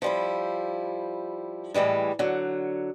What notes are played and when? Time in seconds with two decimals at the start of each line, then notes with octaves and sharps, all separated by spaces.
0.02 F3 G3 E4
1.74 A2 E3 G3 G#3
2.19 D3 F#3